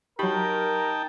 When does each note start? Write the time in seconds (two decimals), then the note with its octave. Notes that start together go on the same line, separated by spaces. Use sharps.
0.19 F#3 D#4 G4 A#4 G5 A5 B5